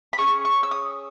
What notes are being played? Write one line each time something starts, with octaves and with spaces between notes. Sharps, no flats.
B5
C#4 G#4 C#6
C#6
E6
D#6